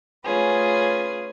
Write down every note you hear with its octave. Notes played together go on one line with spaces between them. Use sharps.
A3 C#4 F4 G#4 B4